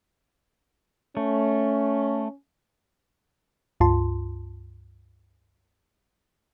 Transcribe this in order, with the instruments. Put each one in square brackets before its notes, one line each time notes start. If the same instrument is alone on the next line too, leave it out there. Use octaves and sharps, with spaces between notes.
[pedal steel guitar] A3 [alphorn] C#4
[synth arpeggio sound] C#2 G2 F4 A5 C6